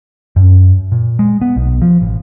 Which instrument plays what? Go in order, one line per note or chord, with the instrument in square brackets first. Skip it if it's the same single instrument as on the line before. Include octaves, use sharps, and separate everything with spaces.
[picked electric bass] F#2
A#2
G#3
B3
B1
F3
A1